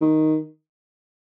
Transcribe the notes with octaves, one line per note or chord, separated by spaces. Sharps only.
D#3